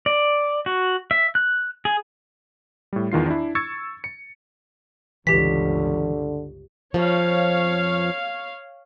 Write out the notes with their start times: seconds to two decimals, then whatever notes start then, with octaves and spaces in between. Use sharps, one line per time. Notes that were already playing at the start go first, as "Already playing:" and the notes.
0.06 D5
0.66 F#4
1.11 E5
1.35 F#6
1.85 G#4
2.93 A2 G3
3.12 E2 D#3 F4 C7
3.26 D4 E4
3.55 C#6 E6 G#6 A6 C#7
4.04 C#7
5.27 G1 C#2 D3 E3 G4 B6
6.94 F2 F3 C#5 F5